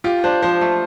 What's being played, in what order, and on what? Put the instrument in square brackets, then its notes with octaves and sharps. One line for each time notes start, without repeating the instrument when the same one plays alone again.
[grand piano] F4 [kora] G4
[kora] D4 [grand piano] C5
[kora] F3 [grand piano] C5
[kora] A3